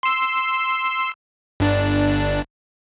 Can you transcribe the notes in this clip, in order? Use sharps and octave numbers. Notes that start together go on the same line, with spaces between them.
C6 E6
G1 D4